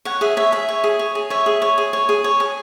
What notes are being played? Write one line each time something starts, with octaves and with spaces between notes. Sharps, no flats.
C#5 F#5
G#4 E5
C#5 E5
G#4 E5
C#5
G#4
C#5
G#4
C#5 E5
G#4
C#5
G#4
C#5
G#4
C#5
G#4